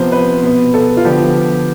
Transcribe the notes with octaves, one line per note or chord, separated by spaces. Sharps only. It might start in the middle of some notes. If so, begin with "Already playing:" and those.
Already playing: C3 F3 B3 C5
B4
B2 B3
A4
F4
D3 F3 B3 G4